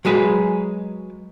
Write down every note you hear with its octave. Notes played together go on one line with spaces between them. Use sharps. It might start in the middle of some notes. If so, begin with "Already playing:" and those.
F#3 G#3 G#4 B4